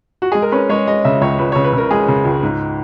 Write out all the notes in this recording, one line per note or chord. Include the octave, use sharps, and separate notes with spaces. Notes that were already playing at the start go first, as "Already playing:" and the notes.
F#4
G#3 G#4
A#4
C#4 B4
G#3 C#5
G#3 D#5
C#3 E5
C#2 C#5
C#2 B4
C#5
C#3
B4
C#3 A#4
G#3 G#4
C#3
C#2
G#2